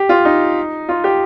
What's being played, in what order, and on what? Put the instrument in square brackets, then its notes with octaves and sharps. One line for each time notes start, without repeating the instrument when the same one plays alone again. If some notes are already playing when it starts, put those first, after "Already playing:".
Already playing: [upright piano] G4
F4
D#4
F4
G4